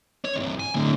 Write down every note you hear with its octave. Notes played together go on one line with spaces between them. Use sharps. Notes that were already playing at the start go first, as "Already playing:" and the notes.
C#5
C2 G2
G#5
A2 D3